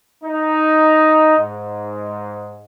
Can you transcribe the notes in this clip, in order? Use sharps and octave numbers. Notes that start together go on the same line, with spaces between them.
D#4
G#2